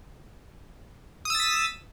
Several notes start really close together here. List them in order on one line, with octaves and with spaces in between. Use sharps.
D#6 E6 A6 B6